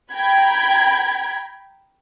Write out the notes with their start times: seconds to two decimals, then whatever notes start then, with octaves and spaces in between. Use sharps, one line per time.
0.12 G5 A#5 B5 G#6